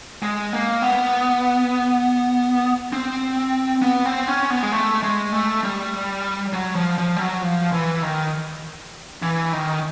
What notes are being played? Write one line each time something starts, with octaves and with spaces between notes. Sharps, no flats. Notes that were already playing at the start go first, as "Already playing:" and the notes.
G#3
A#3
B3
C4
B3
C4
C#4
B3
G#3
A3
G#3
A3
G3
F#3
F3
F3
G3
F#3
F3
E3
D#3
E3
D#3